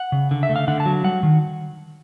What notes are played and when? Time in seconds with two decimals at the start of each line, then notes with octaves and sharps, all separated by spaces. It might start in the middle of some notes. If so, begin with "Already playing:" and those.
Already playing: F#5
0.12 C#3
0.31 D3
0.43 E5
0.50 A3
0.56 F5
0.68 D3 F#5
0.80 A5
0.86 F#3
1.04 G3 F#5
1.23 D#3